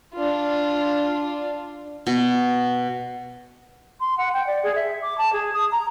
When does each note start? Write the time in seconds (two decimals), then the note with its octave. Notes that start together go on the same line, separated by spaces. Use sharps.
0.14 D4 F4
2.07 B2
4.00 C6
4.17 F#5
4.34 G5
4.47 D5
4.63 G#4
4.76 E5
5.02 D6
5.18 A5
5.33 G#4
5.54 D#6
5.72 A#5